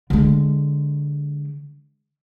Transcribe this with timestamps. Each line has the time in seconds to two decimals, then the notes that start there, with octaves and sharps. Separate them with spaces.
0.10 D3 G#3